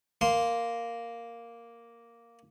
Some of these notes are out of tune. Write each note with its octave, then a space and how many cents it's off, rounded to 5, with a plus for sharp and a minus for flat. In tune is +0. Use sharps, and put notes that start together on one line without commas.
A#3 +0 C6 +0